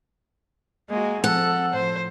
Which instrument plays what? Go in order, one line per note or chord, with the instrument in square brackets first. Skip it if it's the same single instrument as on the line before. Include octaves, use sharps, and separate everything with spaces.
[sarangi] G#3 [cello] A#3 F#4
[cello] F3 C4 [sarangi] A4 [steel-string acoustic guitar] F#5
[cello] A2 F3 [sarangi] C5